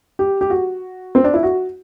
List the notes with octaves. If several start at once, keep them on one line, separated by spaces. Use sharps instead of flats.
G4
G4
F#4
C4
D4
E4
F#4